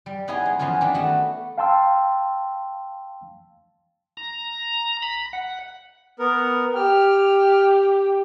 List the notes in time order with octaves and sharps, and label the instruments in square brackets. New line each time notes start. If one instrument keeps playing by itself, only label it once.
[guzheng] G3
B3 D#4 E4 G#4 C#5 G#5
G#3
E3 F3 B3 C#4 F4
D#3 D4 G4
A3 B3 F#4
[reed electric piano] F5 G5 A5 C6 E6
[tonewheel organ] A#5
B5
F#5
[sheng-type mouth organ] B3 A#4
[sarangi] G4 [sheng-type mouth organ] F6